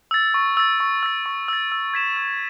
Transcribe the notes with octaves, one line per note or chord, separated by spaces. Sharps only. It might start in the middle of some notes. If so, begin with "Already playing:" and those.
E6 A6
C#6
E6 A6
C#6
E6 A6
C#6
E6 A6
E6
G#6 B6 E7
E6